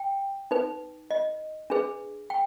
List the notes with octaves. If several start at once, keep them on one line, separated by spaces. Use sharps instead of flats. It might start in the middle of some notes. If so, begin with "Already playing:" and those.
Already playing: G5
D#4 B4
D#5
D4 G#4 B4
G5